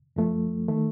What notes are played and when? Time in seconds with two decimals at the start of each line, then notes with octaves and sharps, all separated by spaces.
0.16 F#2 F3 A3
0.68 D#3 A3